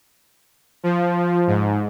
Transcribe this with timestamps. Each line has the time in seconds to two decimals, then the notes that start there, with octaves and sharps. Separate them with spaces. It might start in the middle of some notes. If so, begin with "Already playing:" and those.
0.83 F3
1.47 G#2